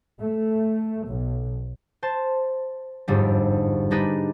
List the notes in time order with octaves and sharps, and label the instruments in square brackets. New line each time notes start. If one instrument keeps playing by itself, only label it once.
[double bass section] A3
B1
[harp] C5 A5
G1 F2 G#2 G3
G3 D4 D#4 G#4 B4